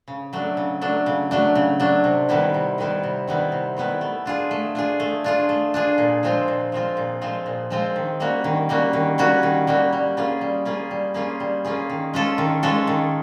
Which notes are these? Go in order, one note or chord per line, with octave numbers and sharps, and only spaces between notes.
C#3
F#3 A3 D4
C#3
F#3 A3 D4
C#3
F#3 A3 D4
C#3
F#3 A3 D4
C3
D#3 G3 B3 E4
C3
D#3 G3 B3 E4
C3
D#3 G3 B3 E4
C3
D#3 G3 B3 E4
A3
D4 F4 G#4
A3
D4 F4 G#4
A3
D4 F4 G#4
A3
D4 F4 G#4
A#2
F3 G#3 C4 F4
A#2
F3 G#3 C4 F4
A#2
F3 G#3 C4 F4
A#2
F3 G#3 C4 F4
D#3
G3 A#3 C#4 F#4
D#3
G3 A#3 C#4 F#4
D#3
G3 A#3 C#4 F#4
D#3
G3 A#3 C#4 F#4
G3
A#3 C#4 F4 G#4
G3
A#3 C#4 F4 G#4
G3
A#3 C#4 F4 G#4
G3
A#3 C#4 F4 G#4
D#3
G#3 C#4 F4 A4
D#3
G#3 C#4 F4 A4
D#3